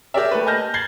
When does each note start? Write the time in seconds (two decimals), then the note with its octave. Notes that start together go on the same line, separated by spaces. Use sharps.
0.14 G4 G#4 A#4 D5 E5
0.31 A3 B4
0.46 D#5 G#5 A5 F6 G6 A#6
0.74 G#6 A6 C7 F#7 G7